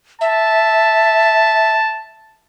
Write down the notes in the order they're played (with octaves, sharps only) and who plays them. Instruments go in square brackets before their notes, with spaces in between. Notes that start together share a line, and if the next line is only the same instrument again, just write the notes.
[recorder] E5 [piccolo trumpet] A5